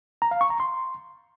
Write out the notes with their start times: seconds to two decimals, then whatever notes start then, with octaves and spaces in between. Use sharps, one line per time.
0.22 A#5
0.31 F5
0.41 C#6
0.50 A#5
0.60 C6